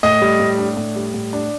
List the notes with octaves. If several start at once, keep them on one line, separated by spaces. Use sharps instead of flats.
A2 D#5
G3
A2
D4
A2
G3
A2
D4